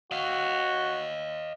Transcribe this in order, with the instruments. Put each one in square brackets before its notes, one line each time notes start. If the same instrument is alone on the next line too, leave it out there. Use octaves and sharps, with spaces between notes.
[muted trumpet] F#4 [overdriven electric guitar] D#5 F5